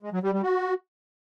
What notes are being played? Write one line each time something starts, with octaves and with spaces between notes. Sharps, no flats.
G#3
F#3
G3
G3
F#4